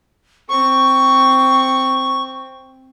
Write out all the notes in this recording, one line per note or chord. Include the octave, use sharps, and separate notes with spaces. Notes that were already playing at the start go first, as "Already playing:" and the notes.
C4 C#6